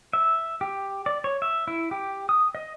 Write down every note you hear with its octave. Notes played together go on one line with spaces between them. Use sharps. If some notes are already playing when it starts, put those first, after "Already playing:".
E5
G4
D5
C#5
E5
E4
G4
D#6
D#5